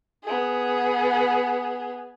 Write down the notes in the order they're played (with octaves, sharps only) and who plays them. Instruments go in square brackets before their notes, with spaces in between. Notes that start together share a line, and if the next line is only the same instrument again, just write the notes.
[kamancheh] B3 G#4